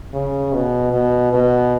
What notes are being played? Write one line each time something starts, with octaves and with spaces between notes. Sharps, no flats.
C#3
B2
B2
B2